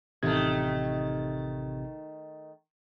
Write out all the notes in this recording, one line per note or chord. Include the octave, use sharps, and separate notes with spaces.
A1 C3 D#3 A3 G#6